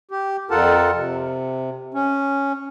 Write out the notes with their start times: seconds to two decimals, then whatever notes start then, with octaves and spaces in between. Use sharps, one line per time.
0.11 G4
0.51 F2 F4 A4 A#4 F#5 A5
0.95 C3
1.94 C#4